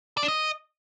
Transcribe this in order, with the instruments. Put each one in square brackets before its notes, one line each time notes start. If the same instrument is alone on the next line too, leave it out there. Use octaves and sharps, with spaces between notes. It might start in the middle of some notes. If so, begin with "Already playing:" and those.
[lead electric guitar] D5
D4
D#5